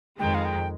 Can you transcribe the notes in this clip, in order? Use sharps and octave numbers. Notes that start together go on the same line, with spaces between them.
F2 D#3 G#3 G5
F5
G5